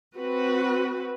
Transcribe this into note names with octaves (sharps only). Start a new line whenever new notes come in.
C4 F#4 B4